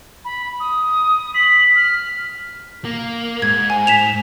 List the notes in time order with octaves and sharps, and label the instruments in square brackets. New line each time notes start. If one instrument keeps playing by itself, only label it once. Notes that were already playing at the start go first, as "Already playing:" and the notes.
[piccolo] B5
D#6
[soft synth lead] B6 [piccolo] F#7
[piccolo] F6
[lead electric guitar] A#3
[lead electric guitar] G#2 [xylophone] G#6
[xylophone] G#5
B6 E7 F7